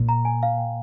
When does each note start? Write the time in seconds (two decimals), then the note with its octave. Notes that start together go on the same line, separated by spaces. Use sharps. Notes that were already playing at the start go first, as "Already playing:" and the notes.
Already playing: A#2
0.09 A#5
0.25 G#5
0.43 F5
0.58 G5